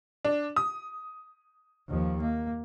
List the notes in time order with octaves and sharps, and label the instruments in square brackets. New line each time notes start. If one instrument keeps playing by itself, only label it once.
[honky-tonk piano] D4
D#6
[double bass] D#2 F3
A#3